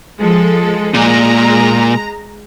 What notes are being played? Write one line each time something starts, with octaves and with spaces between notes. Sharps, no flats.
F3 G#3 A4
A#2 G#3 A#5